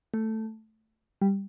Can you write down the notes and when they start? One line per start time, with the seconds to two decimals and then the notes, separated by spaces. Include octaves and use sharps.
0.14 A3
1.22 G3